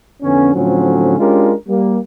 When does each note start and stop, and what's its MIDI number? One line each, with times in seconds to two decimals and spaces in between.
0.23 0.54 41
0.23 0.54 50
0.23 0.54 59
0.23 0.54 61
0.55 1.18 45
0.55 1.18 50
0.55 1.18 53
0.55 1.18 54
0.55 1.18 60
0.55 1.18 61
1.19 1.54 56
1.19 1.54 61
1.19 1.54 62
1.19 1.54 65
1.19 1.54 67
1.19 1.54 70
1.68 1.99 55
1.68 1.99 58